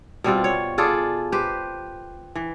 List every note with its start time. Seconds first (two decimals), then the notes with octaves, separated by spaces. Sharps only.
0.24 B2 G3 C4 F4
0.44 C#5
0.78 F4 G#4 A4 D5
1.32 G4 B4 C5
2.35 E3